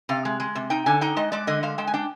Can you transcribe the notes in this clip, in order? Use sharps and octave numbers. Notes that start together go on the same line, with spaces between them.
C3 F5
G#3
G#3
C3
D#4 G5
D3 G#5
D#4 G5
G#3 D#5
G#3 D5
D3 D#5
G#3 F5
G#3 G5
G#5
D4 G5